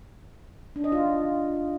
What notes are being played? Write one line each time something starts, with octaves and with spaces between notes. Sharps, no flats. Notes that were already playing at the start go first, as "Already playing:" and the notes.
D4
D#5
F4